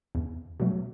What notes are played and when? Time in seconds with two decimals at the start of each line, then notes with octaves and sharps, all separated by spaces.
0.15 E2
0.60 B2 F#3 A3